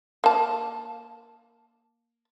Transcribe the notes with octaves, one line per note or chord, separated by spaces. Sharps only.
A#3 A5